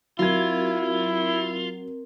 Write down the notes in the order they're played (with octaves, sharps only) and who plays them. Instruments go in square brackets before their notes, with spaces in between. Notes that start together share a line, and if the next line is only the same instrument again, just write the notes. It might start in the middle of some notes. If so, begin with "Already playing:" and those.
[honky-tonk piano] F#3 G#6 [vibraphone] C4 A#4 [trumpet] E4 [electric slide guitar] F4